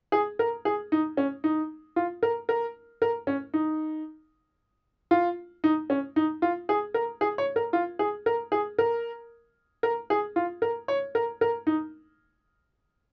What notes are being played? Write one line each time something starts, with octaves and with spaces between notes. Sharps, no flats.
G#4
A#4
G#4
D#4
C#4
D#4
F4
A#4
A#4
A#4
C#4
D#4
F4
D#4
C#4
D#4
F4
G#4
A#4
G#4
C#5
A#4
F4
G#4
A#4
G#4
A#4
A#4
G#4
F4
A#4
C#5
A#4
A#4
D#4